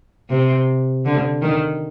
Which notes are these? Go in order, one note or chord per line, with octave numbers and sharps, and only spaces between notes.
C3
D3
D#3